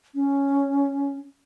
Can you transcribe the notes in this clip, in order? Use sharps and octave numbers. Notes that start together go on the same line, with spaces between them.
C#4